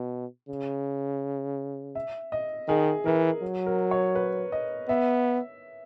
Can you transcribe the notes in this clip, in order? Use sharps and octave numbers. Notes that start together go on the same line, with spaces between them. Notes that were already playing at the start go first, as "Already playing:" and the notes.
Already playing: B2
C#3
E5
D#5
D#3 G#4
E3 A#4
F#3
A#4
C#5
B4
D#5
B3 E5